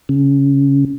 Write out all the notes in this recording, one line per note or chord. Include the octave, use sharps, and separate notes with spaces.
C#3